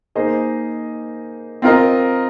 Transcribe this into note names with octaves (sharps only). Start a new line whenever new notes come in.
A#3 D#4 G#4 C5 D#5
C4 F4 A#4 D#5